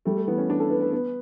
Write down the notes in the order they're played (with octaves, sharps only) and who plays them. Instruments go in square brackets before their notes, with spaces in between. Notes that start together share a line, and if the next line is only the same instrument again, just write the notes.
[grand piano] G3 [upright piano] A3
[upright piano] A3
[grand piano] E3 [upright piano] B3
[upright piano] C#4
[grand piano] E3 [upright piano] D4
[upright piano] A4
[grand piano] B3 [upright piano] B4
[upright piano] B4
[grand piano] B3